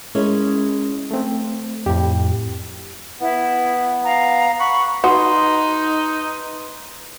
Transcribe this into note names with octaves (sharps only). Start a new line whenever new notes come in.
G#3 C#4 E4 A#4 C#5
A3 C4
F2 A2 G4
B3 E4
F5 A#5
F#5 B5 C#6
D#4 F#4 B4 C6 D#6